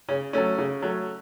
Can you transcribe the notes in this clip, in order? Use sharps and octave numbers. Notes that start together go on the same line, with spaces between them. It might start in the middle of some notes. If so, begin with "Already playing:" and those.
C#3 C#4
F#3 A3 C#4
C#3
F#3 A3 C#4